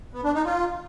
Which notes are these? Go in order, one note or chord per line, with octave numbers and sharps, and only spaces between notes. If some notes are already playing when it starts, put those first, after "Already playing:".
B3
D4
D#4
F4